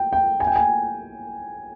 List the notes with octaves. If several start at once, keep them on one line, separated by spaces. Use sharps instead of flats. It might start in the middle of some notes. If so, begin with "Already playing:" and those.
Already playing: G5
G5
G#5
G5
G#5